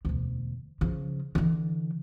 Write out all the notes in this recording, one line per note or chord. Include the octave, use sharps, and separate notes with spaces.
E1 D2
C#3 F3
D3 E3